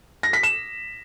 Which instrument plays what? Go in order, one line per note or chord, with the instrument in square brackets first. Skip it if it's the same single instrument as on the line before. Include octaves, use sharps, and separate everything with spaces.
[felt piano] A#6
B6
E7